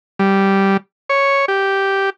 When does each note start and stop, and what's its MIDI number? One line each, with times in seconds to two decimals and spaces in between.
0.19 0.77 55
1.09 1.45 73
1.48 2.10 67